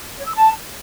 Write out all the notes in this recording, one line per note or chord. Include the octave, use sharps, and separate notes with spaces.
C#5
E6
A5